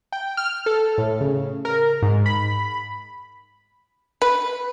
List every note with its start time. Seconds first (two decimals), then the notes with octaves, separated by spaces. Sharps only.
0.12 G5
0.37 F6
0.66 A4
0.98 A2
1.21 C#3
1.65 A#4
2.02 G#2
2.26 B5
4.22 B4